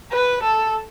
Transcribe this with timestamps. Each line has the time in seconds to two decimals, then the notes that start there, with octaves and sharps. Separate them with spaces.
0.12 B4
0.43 A4